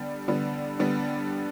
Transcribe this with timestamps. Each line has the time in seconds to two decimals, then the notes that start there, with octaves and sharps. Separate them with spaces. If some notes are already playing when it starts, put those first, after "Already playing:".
Already playing: D3 G3 B3
0.28 D3 G3 B3
0.79 D3 G3 B3